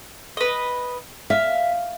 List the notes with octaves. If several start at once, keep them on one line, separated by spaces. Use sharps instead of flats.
B4 D#5
E5 F5